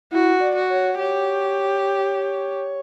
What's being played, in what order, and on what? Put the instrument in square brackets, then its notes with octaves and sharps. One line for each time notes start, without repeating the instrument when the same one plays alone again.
[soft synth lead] E4 [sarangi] F#4
[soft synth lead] D5
[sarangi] F#4
[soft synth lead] C#5
[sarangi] G4 [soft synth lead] C#5